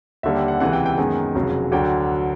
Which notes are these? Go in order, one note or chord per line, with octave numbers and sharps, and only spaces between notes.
D#2 D3 G3 A#3 E5
G5
F#5
C#2 C3 E3 F#5
G5
G5
F#2 D#3 G#3 B3 G#5
F1 F2 C#3 F#3
D2 D3 F#3 G5